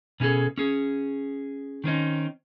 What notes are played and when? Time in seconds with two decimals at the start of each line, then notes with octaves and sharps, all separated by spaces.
0.20 B2 C#4 D#4 G#4 A4
0.58 C#4 G#4
1.84 D#3 C4 C#4 D#4